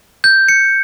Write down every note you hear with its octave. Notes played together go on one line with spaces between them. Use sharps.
G6
C#7